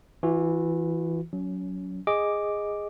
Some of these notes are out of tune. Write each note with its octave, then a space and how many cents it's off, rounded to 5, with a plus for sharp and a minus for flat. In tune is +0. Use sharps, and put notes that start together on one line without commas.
E3 +0 F#4 -40
F#3 +0 C#4 +25
G#4 -15 D#5 +0 D6 +0